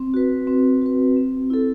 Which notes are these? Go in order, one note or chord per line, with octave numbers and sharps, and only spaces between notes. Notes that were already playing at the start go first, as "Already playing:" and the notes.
Already playing: C4
F#4 B4
C4
F#4 B4
C4
E4 A4